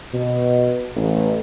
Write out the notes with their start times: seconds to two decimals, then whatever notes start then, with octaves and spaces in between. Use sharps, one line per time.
0.14 B2
0.95 A1